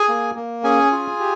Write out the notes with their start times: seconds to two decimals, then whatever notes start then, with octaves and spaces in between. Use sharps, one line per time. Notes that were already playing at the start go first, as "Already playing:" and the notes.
Already playing: G#4 G#5
0.09 A#3
0.36 A#3
0.63 C#4 G#4 G#5
0.92 F4
1.20 G4